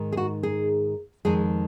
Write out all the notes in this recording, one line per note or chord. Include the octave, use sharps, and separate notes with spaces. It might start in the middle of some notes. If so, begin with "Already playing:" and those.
Already playing: G#2 D#3 G#3
G#4
F#4
G#4
F2 D#3 G#3 G#4